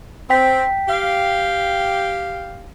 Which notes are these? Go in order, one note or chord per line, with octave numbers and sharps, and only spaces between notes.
C4 G5 B6
G4 F5